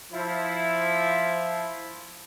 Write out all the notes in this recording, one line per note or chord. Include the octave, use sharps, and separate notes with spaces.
F3 E4